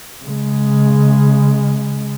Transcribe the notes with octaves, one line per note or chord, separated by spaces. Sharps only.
C#3 G#3